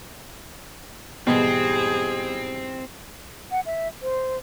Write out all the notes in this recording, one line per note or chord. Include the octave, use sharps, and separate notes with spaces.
G#2 B2 E3 G3 C4 G#4
F#5
E5
C5